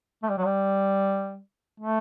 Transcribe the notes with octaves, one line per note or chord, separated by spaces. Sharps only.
A3
G3
F#3
G3
A3